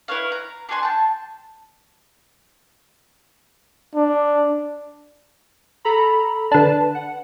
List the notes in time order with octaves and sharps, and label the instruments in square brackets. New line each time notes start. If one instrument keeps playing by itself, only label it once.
[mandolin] E4 B4 C#5 F5
A#5
D4 F#4 G#5 C6
G5 A5
[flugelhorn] D4
[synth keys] A4 A#5 B5
[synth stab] D3 D4 [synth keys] B4 A5
[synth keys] F#5